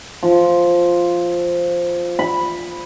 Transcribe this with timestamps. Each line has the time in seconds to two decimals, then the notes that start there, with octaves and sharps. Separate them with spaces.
0.23 F3
2.19 B5